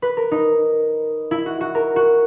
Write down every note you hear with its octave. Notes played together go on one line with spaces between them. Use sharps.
B4
A#4
D#4
E4
F#4
F#4
A#4
F#4